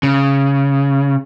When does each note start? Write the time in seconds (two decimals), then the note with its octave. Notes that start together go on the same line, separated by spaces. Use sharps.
0.03 C#3